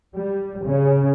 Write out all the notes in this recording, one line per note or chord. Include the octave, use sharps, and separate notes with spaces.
G3
C#3